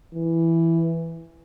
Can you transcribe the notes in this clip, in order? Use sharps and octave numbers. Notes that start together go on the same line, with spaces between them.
E3